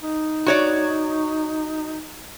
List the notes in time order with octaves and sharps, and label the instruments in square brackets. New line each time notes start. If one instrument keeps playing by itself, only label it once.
[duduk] D#4
[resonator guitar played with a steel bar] F#4 C#5 D5